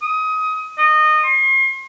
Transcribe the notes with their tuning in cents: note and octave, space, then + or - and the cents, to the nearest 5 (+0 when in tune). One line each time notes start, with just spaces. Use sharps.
D#6 +20
D#5 -20
C6 +40